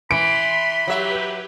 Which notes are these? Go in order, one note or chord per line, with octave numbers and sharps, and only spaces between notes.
E3 B5 C6 D7
F#3 G4 B4 E5